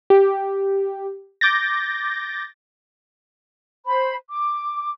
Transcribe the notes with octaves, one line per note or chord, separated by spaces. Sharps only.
G4
D6 G6 A6 A#6
C5 B5
D6